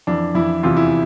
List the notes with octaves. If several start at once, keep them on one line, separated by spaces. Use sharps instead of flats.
F2 E3 D4
F2 E3 E4
E2 C3 E3 F4
E4